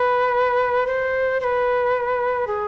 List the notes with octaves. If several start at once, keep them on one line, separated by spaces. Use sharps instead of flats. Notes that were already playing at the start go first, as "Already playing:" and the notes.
Already playing: B4
C5
C5
B4
G#4